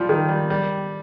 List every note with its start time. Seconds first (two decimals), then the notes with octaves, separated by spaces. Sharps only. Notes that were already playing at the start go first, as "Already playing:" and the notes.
Already playing: F3 G3
0.09 D#3
0.29 G3
0.50 G3